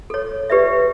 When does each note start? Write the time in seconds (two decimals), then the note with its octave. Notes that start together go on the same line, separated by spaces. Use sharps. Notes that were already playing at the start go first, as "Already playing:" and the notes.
0.10 A4 C#5
0.50 G4 B4 D5 E5